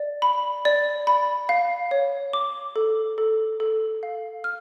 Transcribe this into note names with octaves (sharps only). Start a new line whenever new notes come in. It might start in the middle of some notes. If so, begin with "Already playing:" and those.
Already playing: D5
B5
D5
B5
F5
C#5
D6
A4
A4
A4
F5
F6